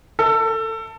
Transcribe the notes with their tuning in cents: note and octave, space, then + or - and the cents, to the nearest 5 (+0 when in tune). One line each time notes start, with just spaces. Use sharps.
A4 +25